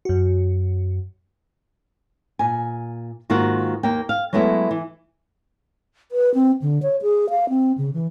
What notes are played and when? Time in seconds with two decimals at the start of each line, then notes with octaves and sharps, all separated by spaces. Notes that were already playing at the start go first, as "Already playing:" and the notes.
0.05 F#2 F#4
2.39 A#2 G#5
3.30 G#2 D#3 A#3 F4 F#4
3.83 D#2 A#3 G5
4.09 F5
4.33 F#3 G#3 A3 B3 E4
4.71 E3
6.12 B4
6.34 C4
6.62 D3
6.82 C#5
7.02 G#4
7.30 F5
7.49 C4
7.78 C#3
7.94 E3